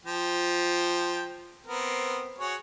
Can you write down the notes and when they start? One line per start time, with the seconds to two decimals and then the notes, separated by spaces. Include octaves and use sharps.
0.05 F3 G5
1.67 B3 C4 A#4
2.39 F#4 G#4 C#5